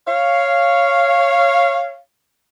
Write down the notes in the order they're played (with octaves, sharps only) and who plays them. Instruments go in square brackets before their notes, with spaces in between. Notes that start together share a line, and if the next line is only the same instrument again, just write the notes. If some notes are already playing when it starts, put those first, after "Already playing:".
[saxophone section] C#5 F5